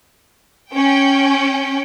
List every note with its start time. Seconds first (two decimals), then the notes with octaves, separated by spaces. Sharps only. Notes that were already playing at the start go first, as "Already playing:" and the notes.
0.71 C#4 G5